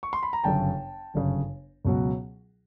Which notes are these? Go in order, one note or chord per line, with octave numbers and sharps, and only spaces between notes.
C#6
C6
B5
A#5
G1 F#2 C#3 G5 A5
G1 F#2 C#3
C#2 B2 F#3